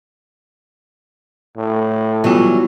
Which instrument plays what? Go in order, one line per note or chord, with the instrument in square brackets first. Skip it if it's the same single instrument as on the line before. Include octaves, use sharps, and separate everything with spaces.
[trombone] A2
[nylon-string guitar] E3 F#3 G3 [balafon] B3 F4